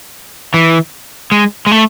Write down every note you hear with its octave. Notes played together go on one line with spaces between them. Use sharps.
E3
G#3
G#3
A3